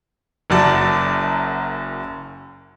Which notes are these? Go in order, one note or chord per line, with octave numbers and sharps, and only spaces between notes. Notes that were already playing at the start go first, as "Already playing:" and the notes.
F#1 F#2 F#3 D5 A5